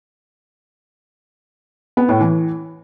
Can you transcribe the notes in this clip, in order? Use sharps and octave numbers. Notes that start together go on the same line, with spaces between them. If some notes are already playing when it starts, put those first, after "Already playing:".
B3
A2
E3